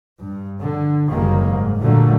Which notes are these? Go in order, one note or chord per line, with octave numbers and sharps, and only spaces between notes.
G2
D3
F#1 F#2 D#3 G3 G#3 A#3
G#2
A#2 D3 F#3 G3 A3 A#3